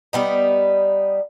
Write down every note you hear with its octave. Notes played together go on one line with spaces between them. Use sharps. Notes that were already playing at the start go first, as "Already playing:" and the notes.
G3 B3 D#4